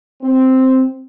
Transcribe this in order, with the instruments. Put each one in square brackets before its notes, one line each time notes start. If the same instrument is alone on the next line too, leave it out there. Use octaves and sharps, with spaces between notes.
[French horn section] C4